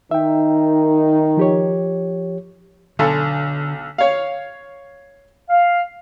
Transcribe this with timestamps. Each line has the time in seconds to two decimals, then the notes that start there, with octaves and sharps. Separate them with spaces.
0.11 D#3 D#4 E5 G5
1.37 F3 G4 C#5
2.99 B1 D3 A4 G#5
3.98 C#5 F5
5.50 F5